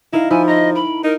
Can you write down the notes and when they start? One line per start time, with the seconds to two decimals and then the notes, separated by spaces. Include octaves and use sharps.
0.13 D#4 E4 A#4 F5
0.31 F3 E4 G#5
0.48 D#5 A#5
0.75 B5 D7
1.04 D#4 A#4